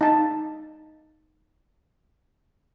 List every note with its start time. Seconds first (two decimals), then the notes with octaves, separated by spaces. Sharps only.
0.01 D#4 A5